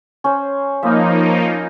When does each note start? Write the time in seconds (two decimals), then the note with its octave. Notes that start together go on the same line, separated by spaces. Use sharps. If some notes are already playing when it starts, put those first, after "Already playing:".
0.24 C#4 C5
0.83 F3 A#3 D#4 E5 B5